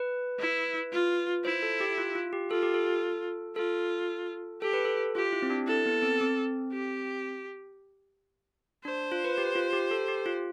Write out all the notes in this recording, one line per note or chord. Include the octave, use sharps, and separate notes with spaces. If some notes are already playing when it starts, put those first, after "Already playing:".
Already playing: B4
E4
F4
E4 C5
A4
G4
F4
F4
G4
F4 A4
G4
A4
F4 A4
G4 A4
B4
A4
F4 G4
E4
C4
D4
E4 A4
B3
C4
C4
G4
D4 C5
F4
B4
G4
F4
G4
A4
G4
F4